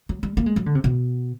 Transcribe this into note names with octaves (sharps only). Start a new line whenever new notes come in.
F#3
G3
A#3
G#3
F#3
D3
C3
B2